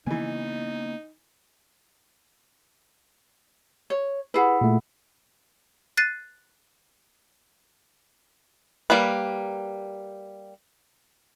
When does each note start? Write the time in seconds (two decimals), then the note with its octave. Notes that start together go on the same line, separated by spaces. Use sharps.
0.06 C#3 E3 A#3 B3 D#4 G#5
3.90 C#5
4.34 E4 G#4 B4 F#5
4.61 A#2 A3
5.97 F#6 A6 C7 D#7
8.90 G3 A#3 A#4 B4